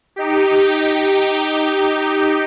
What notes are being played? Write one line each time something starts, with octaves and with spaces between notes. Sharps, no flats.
D#4 G4